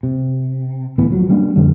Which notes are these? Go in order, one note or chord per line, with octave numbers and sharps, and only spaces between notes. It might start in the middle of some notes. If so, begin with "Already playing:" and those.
C3
D1 A2 E3 B3
F3 F#3
G3 A#3 C#4 D4
F2 D3 G3